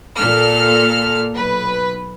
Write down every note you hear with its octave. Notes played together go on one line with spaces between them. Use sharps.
A#2 A4 F6
B1 B4